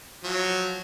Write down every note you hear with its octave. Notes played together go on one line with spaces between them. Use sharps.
F3 F#3